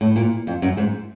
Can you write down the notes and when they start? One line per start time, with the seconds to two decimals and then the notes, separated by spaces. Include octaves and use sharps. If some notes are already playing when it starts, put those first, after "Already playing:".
0.01 A2
0.16 A#2
0.47 F2
0.62 F#2
0.77 G#2